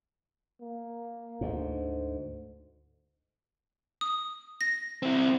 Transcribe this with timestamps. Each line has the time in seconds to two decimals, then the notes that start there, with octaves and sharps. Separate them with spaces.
0.61 A#3
1.41 D2 G#2
4.01 D#6
4.61 A#6
5.03 C4 E4